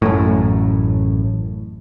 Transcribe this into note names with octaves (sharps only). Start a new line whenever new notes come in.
A1 F#2 A2